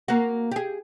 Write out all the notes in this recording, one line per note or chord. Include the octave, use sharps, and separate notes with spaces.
A#3 F#4
G4 G#4